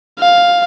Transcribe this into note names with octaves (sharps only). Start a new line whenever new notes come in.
F5